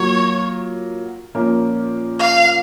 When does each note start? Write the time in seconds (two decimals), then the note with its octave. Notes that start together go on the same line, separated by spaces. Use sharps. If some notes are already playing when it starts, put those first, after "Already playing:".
Already playing: F#3 A#3 F4 C#5
1.35 A#2 F3 A#3 C#4
2.19 F5